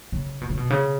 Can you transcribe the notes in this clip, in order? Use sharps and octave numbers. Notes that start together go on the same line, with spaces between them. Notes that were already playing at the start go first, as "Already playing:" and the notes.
C#3
B2
C#3
B2
C#3